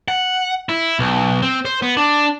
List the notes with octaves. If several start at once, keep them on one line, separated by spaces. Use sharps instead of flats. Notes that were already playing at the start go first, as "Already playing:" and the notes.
F#5
E4
B1
C4
C5
B3
D4